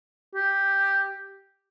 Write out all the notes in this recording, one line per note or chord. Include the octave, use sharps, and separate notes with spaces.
G4